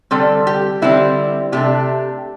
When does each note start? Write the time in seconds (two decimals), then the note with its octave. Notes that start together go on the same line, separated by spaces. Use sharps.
0.11 D3 G3 C4 A4
0.47 G4
0.82 D3 G3 C4 E4
1.52 C3 A3 D4 G4